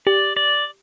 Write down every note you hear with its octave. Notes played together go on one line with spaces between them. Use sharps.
G4 D5
D5